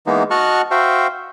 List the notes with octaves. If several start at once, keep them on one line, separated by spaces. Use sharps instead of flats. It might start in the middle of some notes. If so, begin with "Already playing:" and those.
E3 G#3 A#3 B3 D#4
F#4 D#5 F#5 A5 C#6 F6
F#4 C5 E5 F5 G5